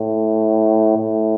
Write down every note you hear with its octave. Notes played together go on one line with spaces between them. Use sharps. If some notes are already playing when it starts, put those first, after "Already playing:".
Already playing: A2
A2